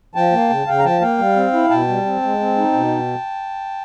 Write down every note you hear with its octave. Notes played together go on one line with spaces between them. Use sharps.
F3 G5 A5
A#3
C#3
C#3 F5 G5
A#5
F3 G5 A5
A#3 F5 G5
G3
C4
E4
B2 G5 A5
G3
C4
G#3
C4
D#4
B2